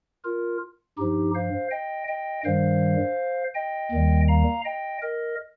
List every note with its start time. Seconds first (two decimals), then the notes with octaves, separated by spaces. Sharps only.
0.24 F4 A#4
0.98 G2 F3 D#4 G4
1.35 C5 F5
1.71 D#5 G5
2.08 D#5 G5
2.45 G2 D#3 G3 C5 F5
3.55 D#5 G5
3.92 D#2 D#3 G3
4.28 F5 A#5
4.65 D#5 G5
5.02 A#4 D#5